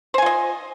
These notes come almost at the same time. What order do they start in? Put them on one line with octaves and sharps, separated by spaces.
C5 G#5 F4 D#5